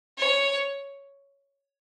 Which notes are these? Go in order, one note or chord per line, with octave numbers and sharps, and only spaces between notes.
C#5